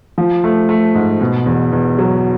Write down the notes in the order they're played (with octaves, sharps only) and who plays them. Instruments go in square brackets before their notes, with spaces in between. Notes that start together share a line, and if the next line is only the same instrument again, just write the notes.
[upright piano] F3
A3
A3
G#2
B2
E2
E2
F#3